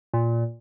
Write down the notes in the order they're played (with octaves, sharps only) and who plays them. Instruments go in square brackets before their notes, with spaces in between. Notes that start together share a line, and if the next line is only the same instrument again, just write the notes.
[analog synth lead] A#2